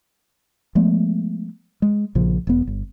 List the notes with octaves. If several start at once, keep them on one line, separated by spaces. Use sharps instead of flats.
F3 G#3 A3 B3
G#3
A#1 A#2 C#3 F3
E1 B3
G1